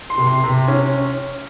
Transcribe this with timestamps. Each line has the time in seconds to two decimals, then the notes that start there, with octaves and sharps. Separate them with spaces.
0.10 C6
0.18 C3
0.27 C6
0.44 C3
0.68 C#4